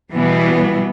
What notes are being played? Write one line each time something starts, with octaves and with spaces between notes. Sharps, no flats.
B2 E3 G3 B3